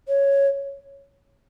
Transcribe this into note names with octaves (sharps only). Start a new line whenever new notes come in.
C#5